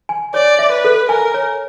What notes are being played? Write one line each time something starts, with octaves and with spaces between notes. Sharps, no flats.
G#5
C#5 D5
E5
B4
A4
A#4 G#5
C#5